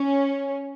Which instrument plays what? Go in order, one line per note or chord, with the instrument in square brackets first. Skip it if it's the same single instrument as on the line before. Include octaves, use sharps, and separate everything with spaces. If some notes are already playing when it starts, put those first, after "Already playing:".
Already playing: [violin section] C#4